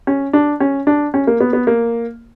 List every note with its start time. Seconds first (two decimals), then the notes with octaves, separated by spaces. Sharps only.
0.07 C#4
0.33 D4
0.60 C#4
0.87 D4
1.14 C#4
1.27 A#3
1.41 B3
1.53 B3
1.67 A#3